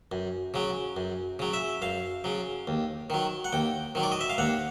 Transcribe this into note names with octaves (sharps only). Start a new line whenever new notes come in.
F#2
C#3 F#3
F#2
C#3 F#3
E5
F#2 F5
C#3 F#3
D#2
D#3 F#3
F#5
D#2 G5
D#3 F#3
D5
D#5
E5
F5
D#2 F#5